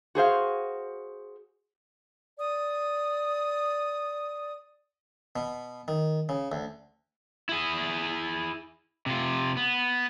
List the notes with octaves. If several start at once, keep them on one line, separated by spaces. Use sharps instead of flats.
F#4 G#4 C5 F5
D5 D#6
B2
D#3
C#3
D2
E4 G#4
C3 F4
B3